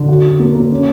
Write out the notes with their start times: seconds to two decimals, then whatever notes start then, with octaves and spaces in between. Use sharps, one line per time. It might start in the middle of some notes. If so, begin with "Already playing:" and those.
Already playing: D3
0.09 F#4
0.24 F#4
0.40 A#3
0.55 A#3
0.71 C#4